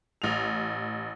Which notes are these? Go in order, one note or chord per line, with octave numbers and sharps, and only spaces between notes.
A1 F7